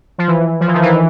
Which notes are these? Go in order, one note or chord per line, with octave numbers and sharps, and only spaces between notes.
F3
E3
F3
E3
D#3
E3